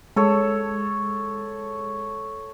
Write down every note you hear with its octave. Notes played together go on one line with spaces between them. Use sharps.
G#3 A4 C#5